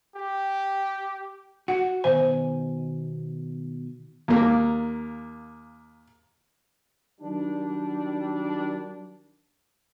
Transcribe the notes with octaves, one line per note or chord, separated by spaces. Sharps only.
G4
F#4 F#5
B2 D#3 C5 G#5
D#2 A#3
D#3 F#3 G3 D4